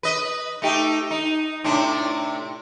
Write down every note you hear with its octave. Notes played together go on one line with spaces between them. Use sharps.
B4 D#5
A3 D#4 G4
D#4
A2 C3 D4